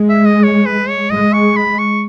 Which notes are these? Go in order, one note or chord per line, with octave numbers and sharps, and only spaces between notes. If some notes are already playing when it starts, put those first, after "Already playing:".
Already playing: G#3
E5
D#5
C#5
B4
C#5
G#3 D#5
C#6
B5
C#6